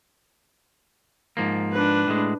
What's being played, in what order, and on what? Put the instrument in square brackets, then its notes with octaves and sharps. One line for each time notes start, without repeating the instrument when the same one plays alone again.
[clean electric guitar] G#2 F3 A#3
[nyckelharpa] D4 B4
[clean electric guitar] A2 G#3